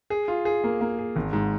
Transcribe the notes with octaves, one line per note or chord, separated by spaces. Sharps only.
G#4
F4
G#4
A#3
A#3
G#4
G#1
G#2